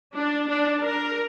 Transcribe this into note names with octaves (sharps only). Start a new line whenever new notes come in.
D4
D4
A#4